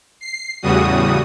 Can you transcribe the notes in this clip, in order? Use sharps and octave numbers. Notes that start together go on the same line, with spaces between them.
C7
E2 A2 C#3 G3 F#4 D#6